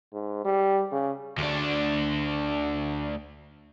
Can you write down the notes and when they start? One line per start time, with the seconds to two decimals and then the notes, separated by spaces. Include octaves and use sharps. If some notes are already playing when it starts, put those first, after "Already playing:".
0.14 G#2
0.45 G3
0.92 C#3
1.38 D2 D4